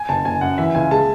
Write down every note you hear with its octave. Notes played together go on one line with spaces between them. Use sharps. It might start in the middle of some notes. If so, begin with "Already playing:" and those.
Already playing: G#5
F#1 A5
F#1 G#5
F#2 F#5
E3 E5
C#2 G#5
G#3 A5